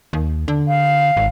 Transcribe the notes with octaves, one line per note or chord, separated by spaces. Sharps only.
D#2
D3
F5
G#1